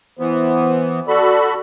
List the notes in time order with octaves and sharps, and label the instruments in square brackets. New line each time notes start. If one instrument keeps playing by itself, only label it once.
[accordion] E3 B3 [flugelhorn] C5
[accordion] F#4 A4 B5 [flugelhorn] D5